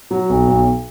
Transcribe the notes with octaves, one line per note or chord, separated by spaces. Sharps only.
F#3
B1
B1